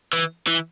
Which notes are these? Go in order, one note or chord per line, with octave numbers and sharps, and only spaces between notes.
E3
E3